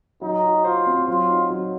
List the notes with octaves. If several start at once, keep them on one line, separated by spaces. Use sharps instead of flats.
F#3 D#4
F#4
F4 C5
C4
F#3 F4
D#4
F#3